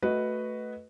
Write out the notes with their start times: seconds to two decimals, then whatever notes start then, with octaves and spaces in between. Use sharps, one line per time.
0.02 A3 F#4 B4 D#5